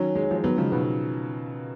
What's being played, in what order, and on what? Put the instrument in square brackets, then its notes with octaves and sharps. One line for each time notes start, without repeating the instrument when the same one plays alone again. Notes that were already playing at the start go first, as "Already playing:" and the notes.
Already playing: [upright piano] D#3 F#3 [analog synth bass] C#4
[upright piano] G#3
F#3
F3 G#3
[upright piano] D#3 F#3 [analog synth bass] B3
[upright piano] C#3 F3 [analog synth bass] G#3
[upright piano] B2 D#3 [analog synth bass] B3